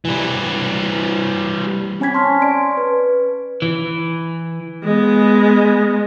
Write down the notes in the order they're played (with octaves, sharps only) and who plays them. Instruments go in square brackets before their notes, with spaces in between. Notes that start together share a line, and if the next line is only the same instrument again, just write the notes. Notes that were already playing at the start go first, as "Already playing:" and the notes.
[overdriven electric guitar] E3 G3
[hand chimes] C4 C#4 G#5 B5 G#6 B6
G#5 A5 C6 C#6 F6 G#6
C#4 D5 D7
B4
[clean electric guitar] E3
[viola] G#3 B3